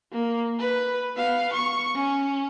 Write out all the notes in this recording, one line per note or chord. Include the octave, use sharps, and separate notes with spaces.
A#3
B4
B3 F5
C#6
C#4